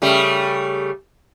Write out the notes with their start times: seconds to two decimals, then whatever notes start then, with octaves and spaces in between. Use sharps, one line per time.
0.02 C#3 G3 A3